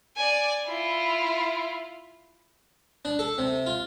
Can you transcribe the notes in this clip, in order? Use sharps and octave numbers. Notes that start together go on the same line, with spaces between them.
D5 G#5
E4 F4
D4
A4
C3
F4